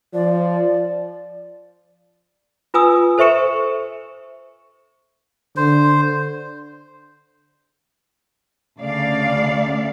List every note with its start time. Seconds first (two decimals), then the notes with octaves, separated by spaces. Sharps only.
0.14 F3 D5
2.74 F4 B4 G#5 D#6 E6
3.18 A4 C5 E5 C#6 C#7 E7
5.57 D3 C5
8.79 D2 C#3 D5 F5